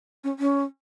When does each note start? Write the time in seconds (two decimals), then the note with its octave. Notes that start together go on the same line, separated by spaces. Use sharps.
0.24 C#4
0.39 C#4